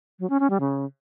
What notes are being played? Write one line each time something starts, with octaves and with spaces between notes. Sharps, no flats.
F#3
C#4
C#4
G3
C#3